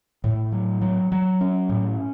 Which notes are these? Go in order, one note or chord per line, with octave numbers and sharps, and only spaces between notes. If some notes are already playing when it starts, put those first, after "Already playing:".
A2
F#3
F#3
F#3
C#4
A2